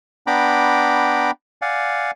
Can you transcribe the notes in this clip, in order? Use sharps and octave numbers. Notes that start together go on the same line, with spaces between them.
B3 D4 G5 A#5 B5 D6
D5 F5 F#5 G#5